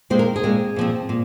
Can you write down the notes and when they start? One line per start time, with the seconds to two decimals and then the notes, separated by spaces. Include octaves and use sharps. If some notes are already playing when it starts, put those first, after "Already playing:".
0.10 A#2 G#3 C4 C5
0.19 A#4
0.36 G#4
0.43 A#2 G#3 C4
0.76 A#2 F3 C4
1.09 A#2